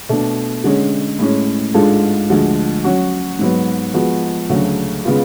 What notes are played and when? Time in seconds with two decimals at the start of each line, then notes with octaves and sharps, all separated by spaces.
0.09 B2 A3 D4
0.64 D3 G#3 C#4
1.19 A2 G#3 C#4
1.74 G#2 G#3 D4 F4 A4
2.30 D2 D3 F3 G#3
2.84 F#3 C#4 F#4
3.39 G#2 F#3 B3
3.94 F3 G#3 B3 F#4
4.49 D2 C#3 F#3 A3 D4
5.05 C#3 G#3 B3 F4